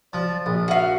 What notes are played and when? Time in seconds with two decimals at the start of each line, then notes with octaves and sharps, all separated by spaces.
0.13 F3 D5
0.46 A#1
0.68 F#4 E5 F5